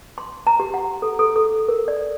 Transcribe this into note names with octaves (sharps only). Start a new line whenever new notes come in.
C6
A#5
G4
F#5
A4
A4
A4
A#4
D5